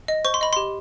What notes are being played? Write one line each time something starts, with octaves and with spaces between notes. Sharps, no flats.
D#5
C5 C#6
C6
D#5 B5
G4 C6